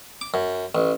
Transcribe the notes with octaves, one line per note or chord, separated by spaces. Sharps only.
D6
F#2
A1